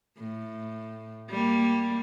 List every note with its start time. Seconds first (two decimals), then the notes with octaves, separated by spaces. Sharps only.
0.18 A2
1.30 G3 A#3